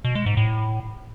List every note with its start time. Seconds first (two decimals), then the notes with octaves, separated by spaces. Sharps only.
0.05 B2
0.15 G#3
0.26 G#2
0.37 A2